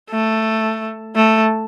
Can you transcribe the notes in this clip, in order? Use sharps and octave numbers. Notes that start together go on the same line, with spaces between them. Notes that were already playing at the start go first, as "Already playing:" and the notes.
A3
A3